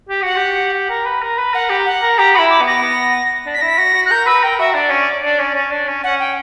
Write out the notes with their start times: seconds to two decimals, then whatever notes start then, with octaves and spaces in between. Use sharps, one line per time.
0.09 G4
0.22 F#4 F#5
0.36 G4
0.90 A#4
1.06 B4
1.22 A#4
1.39 B4
1.53 A#4 F#5
1.69 G4
1.86 F#5
2.02 A#4
2.18 G4 A#5
2.34 F#4 B5
2.39 E4
2.50 D6
2.61 B3
2.67 A#6
2.82 B3
3.46 D4
3.54 B6
3.57 D4
3.61 E4 A#6
3.68 B6
3.78 F#4 A#6
3.94 F#4
4.06 F#6
4.11 A#4 G6
4.26 B4 E6
4.43 A#4 G5
4.59 F#4 E5
4.75 D4 D5
4.91 C#4
5.23 D4
5.39 C#4
5.54 C#4
5.72 D4
5.88 C#4
6.04 C#4 F#5
6.20 G5